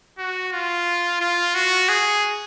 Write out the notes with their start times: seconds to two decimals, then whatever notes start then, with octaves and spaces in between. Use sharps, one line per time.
0.18 F#4
0.52 F4
1.21 F4
1.55 F#4
1.89 G#4